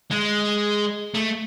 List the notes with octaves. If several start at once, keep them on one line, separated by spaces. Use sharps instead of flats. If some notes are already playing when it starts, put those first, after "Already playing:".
G#3
A3